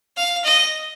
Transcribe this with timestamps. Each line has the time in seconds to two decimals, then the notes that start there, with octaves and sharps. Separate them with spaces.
0.17 F5
0.44 D#5